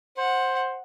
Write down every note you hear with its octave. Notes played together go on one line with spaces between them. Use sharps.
C5 F#5